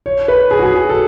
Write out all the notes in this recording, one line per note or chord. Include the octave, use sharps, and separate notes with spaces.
C#5
B4
G#4
F#4
G#4
F#4
A4